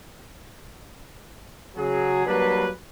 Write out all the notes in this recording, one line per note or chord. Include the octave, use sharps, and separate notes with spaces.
C#3 F#3 F#4 G#4
F#3 G3 A#3 D4 B4